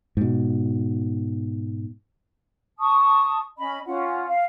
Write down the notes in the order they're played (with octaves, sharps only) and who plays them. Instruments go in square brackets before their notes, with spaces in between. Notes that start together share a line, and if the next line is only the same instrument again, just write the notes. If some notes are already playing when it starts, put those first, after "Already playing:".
[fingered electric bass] G#2 B2
[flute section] A5 C#6 D#6
C#4 D#5 B5
C#4 F4 F#5
F5